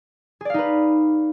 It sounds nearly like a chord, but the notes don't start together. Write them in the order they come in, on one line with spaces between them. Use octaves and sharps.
G#4 D5 F5 D#4 B4